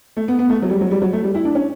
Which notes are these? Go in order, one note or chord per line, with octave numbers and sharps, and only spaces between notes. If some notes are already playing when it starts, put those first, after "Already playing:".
A3
B3
B3
A3
F#3
G3
F#3
G3
F#3
A3
G3
E4
D4
C#4